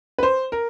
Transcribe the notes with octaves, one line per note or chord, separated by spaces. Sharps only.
B4
C5
A#4